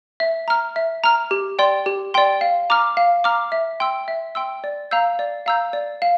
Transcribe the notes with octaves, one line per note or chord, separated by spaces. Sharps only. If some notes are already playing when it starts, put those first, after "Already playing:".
E5
A#5 F6
E5
A#5 F6
G4
D5 G5 C6
G4
D5 G5 C6
F5
A#5 D6 F6
F5
A#5 D6 F6
E5
G5 C6 E6
E5
G5 C6 E6
D5
F5 A#5 E6 G6
D5
F5 A#5 E6 G6
D5
F5